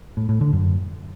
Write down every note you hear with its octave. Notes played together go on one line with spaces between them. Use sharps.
A2
A2
D3
F#2